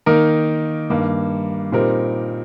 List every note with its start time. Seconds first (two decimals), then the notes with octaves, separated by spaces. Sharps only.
0.06 D#3 A#3 D#4 A#4
0.90 G2 D#3 A#3
1.72 A#2 G3 C4 D#4 A#4